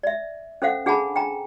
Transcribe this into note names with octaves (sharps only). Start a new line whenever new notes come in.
D5 E5
C#4 A4 C5 F5 F#5
D4 G#4 F#5 G#5 A5 B5
G5 G#5 A#5